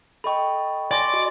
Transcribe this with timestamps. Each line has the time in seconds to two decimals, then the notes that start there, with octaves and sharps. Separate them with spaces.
0.24 A4 D#5 G5 B5 C#6
0.91 D5 G#5 C6 A#6
1.13 F#4 D#5 D6